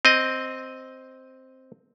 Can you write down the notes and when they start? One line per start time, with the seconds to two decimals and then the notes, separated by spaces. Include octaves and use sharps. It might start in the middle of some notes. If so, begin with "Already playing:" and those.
0.05 C4 D#5